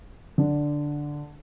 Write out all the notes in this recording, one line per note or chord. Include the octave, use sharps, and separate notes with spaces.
D3 D4